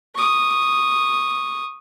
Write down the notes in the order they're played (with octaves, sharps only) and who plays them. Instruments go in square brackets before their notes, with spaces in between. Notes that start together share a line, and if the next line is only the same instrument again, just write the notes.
[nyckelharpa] C#6 D#6